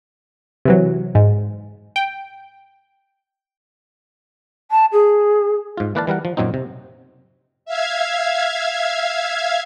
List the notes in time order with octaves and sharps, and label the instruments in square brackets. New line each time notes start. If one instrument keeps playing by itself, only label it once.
[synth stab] C3 E3 F#3
G#2
G5
[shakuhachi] A5
G#4
[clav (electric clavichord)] G#2 F4
E3 A#3 B4 D5 F5 A5
E3 G3 A#4 F#5
F3
F#2 A#2 F#3 C4 D#4
C3
[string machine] E5 F5 G#6